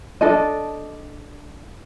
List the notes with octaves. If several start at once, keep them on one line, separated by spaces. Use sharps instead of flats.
D4 A4 D#5